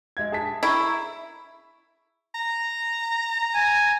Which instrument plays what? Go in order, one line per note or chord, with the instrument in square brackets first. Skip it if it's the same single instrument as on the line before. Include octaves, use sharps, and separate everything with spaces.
[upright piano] G#3 E5 G#6
G#4 A5 B6
[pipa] E4 [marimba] A#5 B5 C#6
[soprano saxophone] A#5
[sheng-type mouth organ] G#5